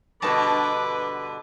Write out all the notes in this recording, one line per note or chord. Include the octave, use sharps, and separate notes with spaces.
G2 B2 D3 B4 D#5 A5 C#6 D6